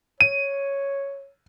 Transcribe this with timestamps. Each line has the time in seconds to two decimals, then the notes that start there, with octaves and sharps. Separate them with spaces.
0.21 C#5 D#7